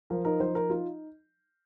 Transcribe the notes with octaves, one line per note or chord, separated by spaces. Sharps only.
F3 A#4
D#4 A#4
F3 C5
D#4 A#4
D#4 F4